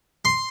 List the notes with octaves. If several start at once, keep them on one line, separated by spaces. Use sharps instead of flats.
C6